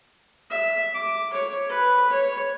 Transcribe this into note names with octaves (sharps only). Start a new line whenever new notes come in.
E5
D6
C#5
B4
C#5